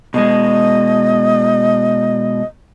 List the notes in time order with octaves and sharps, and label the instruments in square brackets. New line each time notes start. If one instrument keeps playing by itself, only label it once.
[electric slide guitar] B2 G#3 [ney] D#5